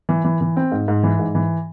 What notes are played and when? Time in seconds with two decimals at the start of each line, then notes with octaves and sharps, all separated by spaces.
0.09 E3
0.25 E3
0.41 E3
0.57 C4
0.72 G#2
0.88 G#2
1.03 E3
1.19 G#2
1.35 E3